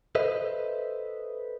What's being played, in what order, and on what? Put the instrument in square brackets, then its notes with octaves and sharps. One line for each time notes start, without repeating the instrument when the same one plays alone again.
[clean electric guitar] A4 B4 C5 D#5 E5